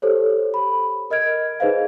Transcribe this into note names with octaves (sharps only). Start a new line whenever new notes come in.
G4 A4 C5 C#5
B5
A#4 D#5 F6 G#6 D7
D#4 G#4 B4 C5 D#5 F5